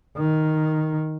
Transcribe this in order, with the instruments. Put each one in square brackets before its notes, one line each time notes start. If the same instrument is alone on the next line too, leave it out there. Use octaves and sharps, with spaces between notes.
[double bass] D#3